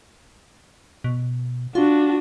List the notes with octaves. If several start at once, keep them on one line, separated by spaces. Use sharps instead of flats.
B2
D4 F4 F#4